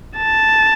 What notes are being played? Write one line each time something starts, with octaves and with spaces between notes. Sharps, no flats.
A5